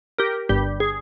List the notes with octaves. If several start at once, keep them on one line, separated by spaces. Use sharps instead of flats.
G4 A#4
G1 G2 G3 G4
G#4